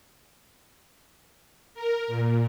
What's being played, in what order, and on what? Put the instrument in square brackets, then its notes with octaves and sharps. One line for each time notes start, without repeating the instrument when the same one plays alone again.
[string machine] A#4
A#2